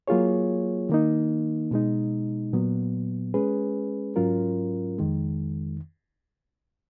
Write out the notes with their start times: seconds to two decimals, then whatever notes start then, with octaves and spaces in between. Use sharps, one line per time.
0.08 F#3 A#3 F4 G#4 C#5
0.89 D#3 A#3 D#4
1.71 B2 G#3 D#4
2.53 A#2 F#3 B3
3.34 G#3 C#4 G#4 B4
4.16 G#2 F#3 C#4 F4 A#4
4.98 F2 D#3 G#3